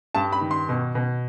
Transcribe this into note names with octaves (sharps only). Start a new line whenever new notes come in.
G2 A5
B5
D#3
C6
B2
B2